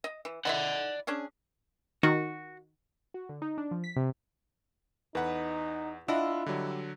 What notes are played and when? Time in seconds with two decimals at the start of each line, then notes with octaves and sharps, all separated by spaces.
0.04 D#5
0.25 E3
0.45 E4 D5 D#5 F#5 B5
1.07 C#4 D4 G#4
2.03 D#3 F#4
3.14 F#4
3.29 D3
3.42 D#4
3.58 D4
3.71 F3
3.84 B6
3.96 C3
5.15 E2 D#4 B4 F#5
6.08 D4 E4 F4 D#5 F#5 E6
6.46 D3 F#3 G3